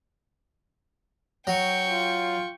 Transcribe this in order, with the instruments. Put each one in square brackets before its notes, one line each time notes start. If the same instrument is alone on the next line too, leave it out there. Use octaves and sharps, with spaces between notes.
[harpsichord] F#3 [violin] G5 C#6
[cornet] F4